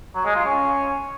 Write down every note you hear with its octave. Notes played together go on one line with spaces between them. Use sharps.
F#3
G#3
F4
C#4